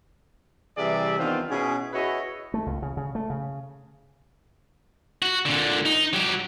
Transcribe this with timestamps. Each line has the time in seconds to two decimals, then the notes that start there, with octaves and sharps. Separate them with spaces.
0.77 C3 E3 G3 G#4 D5 E5
1.19 D#3 E3 B3 C4 D4 F4
1.50 B2 C#4 E4 G#4
1.93 E4 F#4 G#4 B4 C#5 D#5
2.54 A3
2.66 C#2
2.82 C#3
2.97 C#3
3.15 A3
3.30 C#3
5.22 F#4
5.46 A#2 D3
5.85 D#4
6.13 F#3 G4